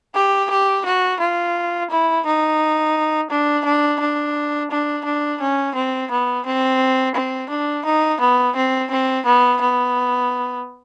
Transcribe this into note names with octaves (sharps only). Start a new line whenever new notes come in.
G4
G4
F#4
F4
E4
D#4
D4
D4
D4
D4
D4
C#4
C4
B3
C4
C4
D4
D#4
B3
C4
C4
B3
B3